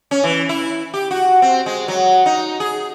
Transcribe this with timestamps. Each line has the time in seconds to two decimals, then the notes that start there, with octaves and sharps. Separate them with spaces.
0.11 C#4
0.24 E3
0.49 E4
0.94 G4
1.11 F#4
1.42 C4
1.66 G#3
1.88 F#3
2.26 D#4
2.60 G#4